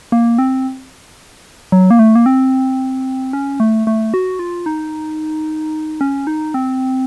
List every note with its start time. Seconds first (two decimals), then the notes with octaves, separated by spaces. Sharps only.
0.12 A#3
0.38 C4
1.72 F#3
1.91 A#3
1.99 A3
2.15 A#3
2.26 C4
3.33 C#4
3.60 A3
3.87 A3
4.14 F#4
4.39 F4
4.66 D#4
6.01 C#4
6.27 D#4
6.54 C4